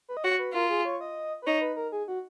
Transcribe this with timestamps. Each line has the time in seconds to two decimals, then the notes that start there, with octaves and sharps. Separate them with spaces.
0.09 B4
0.17 D#5
0.24 F#4 C#5
0.39 B4
0.54 F4 A#4
0.70 G#4
0.85 C#5
1.01 D#5
1.42 B4
1.47 D#4 C#5
1.61 B4
1.77 A#4
1.92 G#4
2.08 F#4